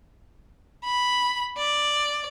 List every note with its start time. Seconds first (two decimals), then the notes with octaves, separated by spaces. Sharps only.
0.84 B5
1.58 D5